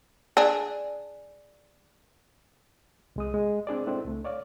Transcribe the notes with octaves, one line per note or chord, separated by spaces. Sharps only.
D4 G#4
C2 G#3 D#6
G#3
C4 D4 G#4 D5
G#3 C4 D4 E4 A4
C#2 A3
C#5 D5 F5